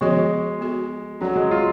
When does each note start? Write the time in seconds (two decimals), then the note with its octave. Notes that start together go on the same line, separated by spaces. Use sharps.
0.01 F3 G#3 B3 F#4 C#5
0.61 B3 F#4 A4
1.21 F#3 C#4 F#4 A4 D5
1.36 G#3
1.51 F4